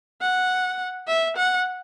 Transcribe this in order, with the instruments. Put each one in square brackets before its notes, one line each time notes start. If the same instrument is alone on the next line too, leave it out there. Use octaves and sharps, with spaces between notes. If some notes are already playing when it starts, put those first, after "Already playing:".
[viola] F#5
E5
F#5